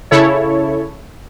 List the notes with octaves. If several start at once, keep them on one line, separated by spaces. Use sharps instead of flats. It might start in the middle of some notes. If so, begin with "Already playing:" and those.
C#3 E4 A4 C#5